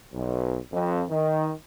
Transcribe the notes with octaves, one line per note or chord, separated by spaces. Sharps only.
B1
F2
D#3